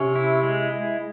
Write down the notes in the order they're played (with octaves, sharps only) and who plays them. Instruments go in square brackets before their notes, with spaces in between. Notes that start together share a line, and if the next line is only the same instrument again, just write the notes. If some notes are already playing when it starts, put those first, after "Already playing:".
Already playing: [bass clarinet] C3 [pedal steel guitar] C#4
[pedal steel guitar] E4
G#3
E4